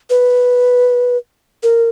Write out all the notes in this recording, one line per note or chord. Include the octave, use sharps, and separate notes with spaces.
B4
A#4